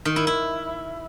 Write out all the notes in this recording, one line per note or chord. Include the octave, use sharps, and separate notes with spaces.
D#3
E4
E4